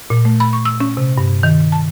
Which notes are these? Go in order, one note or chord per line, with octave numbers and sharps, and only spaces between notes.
A#2
A3
B5
C#6
E6
C#4
C3
G2
D#3
A5